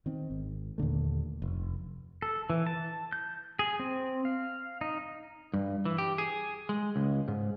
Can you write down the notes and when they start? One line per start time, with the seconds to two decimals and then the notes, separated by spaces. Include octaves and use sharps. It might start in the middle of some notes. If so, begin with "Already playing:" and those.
0.06 D#3 C4
0.30 G#1
0.78 D#2 A#2 D3 A3
1.42 F1
2.22 A4
2.50 E3
2.67 A5
3.12 G6
3.59 G#4
3.80 C4
4.25 F5
4.81 D#4
5.54 G2
5.85 E3
5.98 G4
6.18 G#4
6.69 G#3
6.96 C#2
7.28 G#2